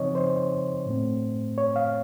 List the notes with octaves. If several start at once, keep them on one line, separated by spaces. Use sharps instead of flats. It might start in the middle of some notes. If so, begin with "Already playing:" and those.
Already playing: C#3 F3 C4 D#4 C#5 D#5
C5
A2 A3 C4
C#5
F5